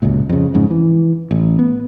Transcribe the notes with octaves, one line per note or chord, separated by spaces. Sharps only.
D1 G1 C#2 A#2
F2 C#3
F2 G#2 C#3
E3
A1
B3